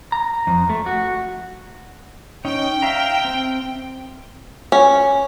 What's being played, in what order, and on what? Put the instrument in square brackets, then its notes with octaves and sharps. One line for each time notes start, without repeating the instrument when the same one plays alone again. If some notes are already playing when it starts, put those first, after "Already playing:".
[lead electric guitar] A#5
F2
A3
F#4
[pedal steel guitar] C#4 D#4 [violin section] G5
[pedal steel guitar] E5 F5 A#5
C4
[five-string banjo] C#4